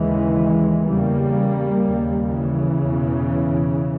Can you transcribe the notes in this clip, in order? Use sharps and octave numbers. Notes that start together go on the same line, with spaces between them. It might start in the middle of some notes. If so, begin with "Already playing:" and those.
Already playing: D#2 C#3 E3 G#3
E2 C#3 G3 A#3
D#2 C#3
C#3 E3
E2 B2